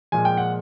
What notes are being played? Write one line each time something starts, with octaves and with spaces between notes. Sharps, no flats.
A#2 F3 G#3 G#5
G5
F#5